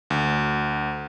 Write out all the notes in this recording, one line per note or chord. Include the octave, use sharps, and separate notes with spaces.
D2